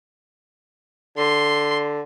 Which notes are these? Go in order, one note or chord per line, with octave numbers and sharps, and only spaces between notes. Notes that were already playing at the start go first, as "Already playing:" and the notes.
D3 C6